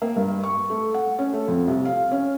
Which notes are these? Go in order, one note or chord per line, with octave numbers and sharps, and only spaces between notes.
A#3
G2
C#6
A3
F#5
C#4
A3
F2
C2
F5
C#4